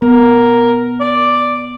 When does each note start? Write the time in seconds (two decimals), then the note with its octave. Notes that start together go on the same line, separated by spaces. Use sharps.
0.02 B3 A#4
1.00 D5